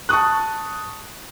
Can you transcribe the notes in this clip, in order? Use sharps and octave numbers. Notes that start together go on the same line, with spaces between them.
A5 C#6 D#6 F#6